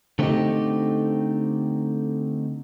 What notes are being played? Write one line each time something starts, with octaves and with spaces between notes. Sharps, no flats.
D3 A3 B3 C4 D#4 G4